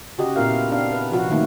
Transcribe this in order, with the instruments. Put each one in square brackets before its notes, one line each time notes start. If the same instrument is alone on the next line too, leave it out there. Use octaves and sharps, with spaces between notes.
[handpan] C#3 F#4 G4 D#5
A#2 B3 E4 F4 A#4 F5
C4 D4 F5
B4
C3 F3 F#4
D#3 A3 A#3 D#4 E4